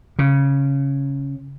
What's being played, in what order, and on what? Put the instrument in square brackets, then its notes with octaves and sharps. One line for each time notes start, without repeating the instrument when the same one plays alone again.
[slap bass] C#3